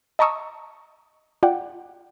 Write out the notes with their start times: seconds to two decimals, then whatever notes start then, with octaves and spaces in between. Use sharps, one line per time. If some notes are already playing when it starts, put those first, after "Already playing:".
0.19 D#5 A5 A#5 C#6 D#6 E6
1.43 F4 D5 F#5 G5